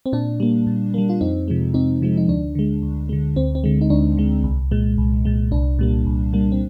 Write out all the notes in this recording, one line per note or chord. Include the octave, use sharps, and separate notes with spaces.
C4
A#2 D4
G3 A#3
A#2
G3 A#3
F4
F2 C4 D#4
C3 F3 G#3
F2 C4 D#4
C3 F3 G#3
D#4
D2 D4
D3 G#3
D2
D3 G#3
D2 C4
C4
D3 G#3
D#4
D2 D4
D3 G#3
C2
A#2 G#3
C2
A#2 G#3
C2 D4
A#2 G3 A#3
C2
A#2 G3 A#3
C4